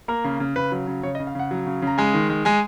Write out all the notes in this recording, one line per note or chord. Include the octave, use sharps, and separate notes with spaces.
A#3 A#4
C#3
C#3
C#3 B4
F#3
C#3
C#3 C#5
D#5
C#3
F5
C#3 F#5
F#3
C#3
C#3 A#5
G#3 G#5
D#3
G#3
G#3 G#5